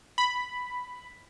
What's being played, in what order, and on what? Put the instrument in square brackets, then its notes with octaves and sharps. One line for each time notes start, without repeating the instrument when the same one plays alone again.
[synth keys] B5